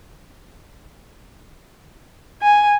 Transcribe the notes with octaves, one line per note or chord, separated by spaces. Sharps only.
G#5